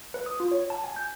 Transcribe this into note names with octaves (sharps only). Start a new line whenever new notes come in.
B4
D#6
F4
C#5
A5
G#5
G6